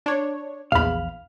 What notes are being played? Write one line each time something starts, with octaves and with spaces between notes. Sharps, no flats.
D4 C#5
A#1 E2 F5 B5